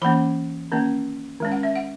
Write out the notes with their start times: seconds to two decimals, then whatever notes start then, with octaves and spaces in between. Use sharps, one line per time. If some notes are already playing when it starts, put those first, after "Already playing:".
0.02 E3 A#3 C#4 B5
0.72 D#3 A#3 C#4
1.40 D#3 G#3 C#4
1.52 F#5
1.63 E5
1.75 F#5